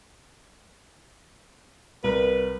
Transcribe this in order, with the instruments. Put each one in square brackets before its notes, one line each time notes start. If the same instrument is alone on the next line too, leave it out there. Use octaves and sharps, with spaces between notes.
[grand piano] C2 A#4 [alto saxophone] B4